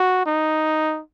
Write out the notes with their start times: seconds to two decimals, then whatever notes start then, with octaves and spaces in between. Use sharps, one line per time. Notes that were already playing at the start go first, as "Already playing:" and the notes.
Already playing: F#4
0.26 D#4